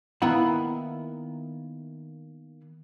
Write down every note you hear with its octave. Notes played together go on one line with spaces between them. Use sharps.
D#3 A#3 B3 E4 F#5 B5